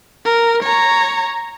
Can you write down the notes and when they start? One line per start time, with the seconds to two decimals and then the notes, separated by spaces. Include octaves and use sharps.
0.25 A#4
0.63 C#5 A#5